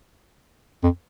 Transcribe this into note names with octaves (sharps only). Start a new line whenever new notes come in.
F2